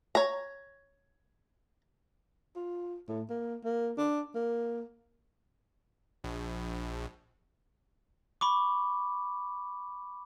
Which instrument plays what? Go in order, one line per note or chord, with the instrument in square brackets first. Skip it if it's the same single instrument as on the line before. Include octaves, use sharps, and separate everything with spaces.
[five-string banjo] C#5 A#5
[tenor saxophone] F4
A2
A#3
A#3
D4
A#3
[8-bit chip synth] A#1
[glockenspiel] B5 C#6 D6